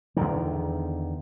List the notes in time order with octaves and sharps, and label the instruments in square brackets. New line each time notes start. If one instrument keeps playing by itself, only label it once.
[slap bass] E2 D3 D#3